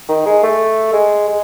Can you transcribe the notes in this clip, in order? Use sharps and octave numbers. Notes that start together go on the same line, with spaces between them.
D#3
G#3
A3
G#3
G#3